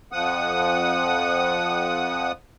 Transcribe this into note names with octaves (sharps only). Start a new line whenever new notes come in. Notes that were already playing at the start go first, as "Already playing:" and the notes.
F2 F3 F#5 D#6